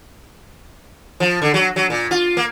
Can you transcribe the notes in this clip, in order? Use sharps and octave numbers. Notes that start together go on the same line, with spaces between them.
F3
D3
F#3
F#3
A#2
F4
A#3